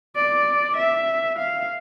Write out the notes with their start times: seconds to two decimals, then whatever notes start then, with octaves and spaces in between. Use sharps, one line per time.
0.16 D5
0.77 E5
1.39 F5